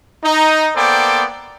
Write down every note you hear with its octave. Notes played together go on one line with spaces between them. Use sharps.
D#4
A#3 B3 A4 C5 D5 G5